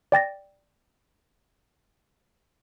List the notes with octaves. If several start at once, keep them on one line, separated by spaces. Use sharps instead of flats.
D5 G5 A6 A#6